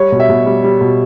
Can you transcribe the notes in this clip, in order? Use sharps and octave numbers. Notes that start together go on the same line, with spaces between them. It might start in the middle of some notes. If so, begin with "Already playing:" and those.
Already playing: G3 C#5
B2
E5
B2
G3
G3
B2